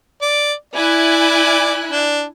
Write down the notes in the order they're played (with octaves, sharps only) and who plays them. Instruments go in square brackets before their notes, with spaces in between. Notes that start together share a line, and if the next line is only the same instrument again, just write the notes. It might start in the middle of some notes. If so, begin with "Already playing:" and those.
[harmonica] D5
[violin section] E4 G#5 F#6 [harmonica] D5
[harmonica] D4